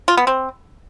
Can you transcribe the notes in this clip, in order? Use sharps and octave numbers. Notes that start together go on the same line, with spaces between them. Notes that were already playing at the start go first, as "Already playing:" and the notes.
F4
B3
C4